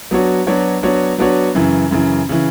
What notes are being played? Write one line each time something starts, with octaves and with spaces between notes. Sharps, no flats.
F#3 B3 D4 F#4 C#5
F#3 B3 D4 F#4 C#5
F#3 B3 D4 F#4 C#5
F#3 B3 D4 F#4 C#5
F#2 C#3 E3
F#2 C#3 E3
C#3 E3